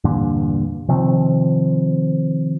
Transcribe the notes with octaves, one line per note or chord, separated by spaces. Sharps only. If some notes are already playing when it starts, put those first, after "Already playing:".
E2 G2 A#2 D3
C3 D#3 F3 C4